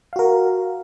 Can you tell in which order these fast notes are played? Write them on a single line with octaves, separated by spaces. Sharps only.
F5 F#4 A#4